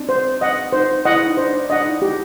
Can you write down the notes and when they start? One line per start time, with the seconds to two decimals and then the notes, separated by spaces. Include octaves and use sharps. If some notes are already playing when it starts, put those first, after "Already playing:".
Already playing: C4 D4 D#4
0.09 C5
0.41 D#5 F#5
0.72 D#4 C5
1.05 E4 D#5 F#5
1.26 D#4
1.37 D4 C5
1.53 D4
1.70 D4 D#5 F#5
1.85 D#4
2.02 G4